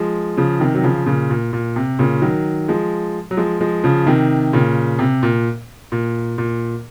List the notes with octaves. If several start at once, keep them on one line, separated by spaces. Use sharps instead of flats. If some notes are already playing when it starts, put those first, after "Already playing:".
Already playing: F3 G#3
C#3 F3
C3 D#3
F#3
C#3 F3
A#2 C#3
A#2
A#2
C3
A#2 C#3
D#3 F#3
F3 G#3
F#3
F3 G#3
F3 G#3
C#3 F3
C3 D#3
A#2 C#3
C3
A#2
A#2
A#2